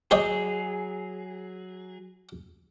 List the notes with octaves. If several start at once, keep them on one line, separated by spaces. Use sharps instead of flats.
F#3 G4 G#4 C#5 D#5